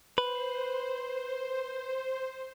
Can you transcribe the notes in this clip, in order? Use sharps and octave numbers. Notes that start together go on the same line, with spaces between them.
B4 C5